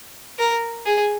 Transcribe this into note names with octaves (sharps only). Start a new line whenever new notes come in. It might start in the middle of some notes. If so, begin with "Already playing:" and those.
A#4
G#4